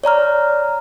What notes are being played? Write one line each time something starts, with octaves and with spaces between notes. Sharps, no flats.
C#5 D5 A#5 F6